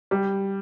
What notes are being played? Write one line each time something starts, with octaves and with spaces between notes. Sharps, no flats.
G3